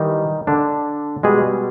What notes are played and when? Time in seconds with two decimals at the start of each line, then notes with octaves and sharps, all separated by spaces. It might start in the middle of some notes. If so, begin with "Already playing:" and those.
Already playing: D#3 E3 G3 D#4
0.47 D3 D4
1.23 B2 G3 G#3 G#4